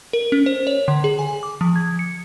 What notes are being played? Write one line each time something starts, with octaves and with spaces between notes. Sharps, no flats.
A#4
C#4
C5
C#5
D3
G#4
G#5
D6
F3
G#6
C#7